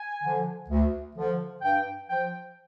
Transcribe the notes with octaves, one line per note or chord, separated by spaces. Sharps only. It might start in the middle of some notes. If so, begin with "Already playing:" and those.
Already playing: G#5
D3 F3
D2
D3 F3
G2 G5
F3 G5